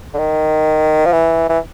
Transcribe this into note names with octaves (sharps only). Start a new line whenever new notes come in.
D3
D#3
F3
E3
E3